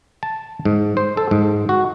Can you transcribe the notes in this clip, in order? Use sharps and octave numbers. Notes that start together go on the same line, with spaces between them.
A5
G#2
C5
A4
G#2
F#4